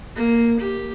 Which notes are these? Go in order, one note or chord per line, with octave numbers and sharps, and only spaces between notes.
A#3
G4